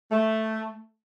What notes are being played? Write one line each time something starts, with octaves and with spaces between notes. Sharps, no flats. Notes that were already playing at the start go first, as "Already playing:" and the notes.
A3